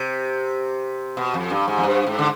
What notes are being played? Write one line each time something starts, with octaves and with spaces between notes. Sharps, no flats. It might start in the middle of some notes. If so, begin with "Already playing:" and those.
Already playing: C3
B2
F2
G2
G#2
F2
G2
G#2
D3